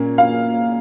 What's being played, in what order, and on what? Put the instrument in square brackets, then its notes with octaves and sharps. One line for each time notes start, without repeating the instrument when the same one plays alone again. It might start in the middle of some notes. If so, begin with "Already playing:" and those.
Already playing: [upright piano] A#2 A#3 C#4
F5